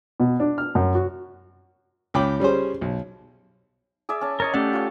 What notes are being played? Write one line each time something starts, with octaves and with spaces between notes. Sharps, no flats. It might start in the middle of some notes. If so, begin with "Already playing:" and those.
B2
D4
F6
F#2
F#4
C#2 G5 B5 D6
G3 C#4 G#4 C5
B1
G#4 D5 E5
C#4 A5
A#4 C#5 D#5 A5
A3 C#4 G4 A4 D5 F#5
F4 C#5